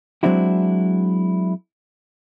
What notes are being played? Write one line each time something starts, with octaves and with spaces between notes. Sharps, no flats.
F#3 G#3 C4 D4 E4 F#4